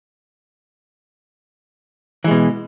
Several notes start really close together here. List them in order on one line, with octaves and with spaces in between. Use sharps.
E3 G#3 B2